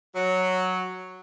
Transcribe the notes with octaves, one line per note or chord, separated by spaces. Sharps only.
F#3